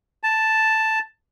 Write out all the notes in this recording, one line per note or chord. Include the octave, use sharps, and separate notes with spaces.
A5